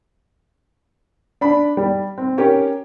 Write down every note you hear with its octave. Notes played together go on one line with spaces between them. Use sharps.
D4 B5
G3
C4
C#4 G4 A#4